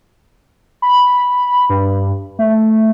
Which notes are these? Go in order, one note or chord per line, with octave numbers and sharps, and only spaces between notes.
B5
G2
A3